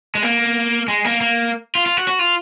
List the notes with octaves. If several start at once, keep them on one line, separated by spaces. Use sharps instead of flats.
G#3
A#3
G#3
A#3
A#3
F4
F4
F#4
F#4
F4